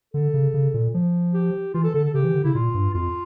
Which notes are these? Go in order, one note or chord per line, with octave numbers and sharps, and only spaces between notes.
D3 A4
C#3
C#3
A#2
F3
G4
E3 F4
A4
D3 A4
A4
C#3 G4
E3
D3
C#3 E4
A#2 F4
G2
F2 F4